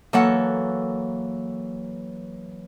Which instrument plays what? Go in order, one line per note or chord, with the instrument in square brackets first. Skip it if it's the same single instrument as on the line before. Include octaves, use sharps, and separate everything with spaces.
[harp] E3 F#3 A#3 [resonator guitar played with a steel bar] A4 C#5 F#5